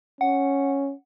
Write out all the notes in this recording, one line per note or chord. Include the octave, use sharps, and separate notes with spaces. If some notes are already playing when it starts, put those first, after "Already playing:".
C#4 F#5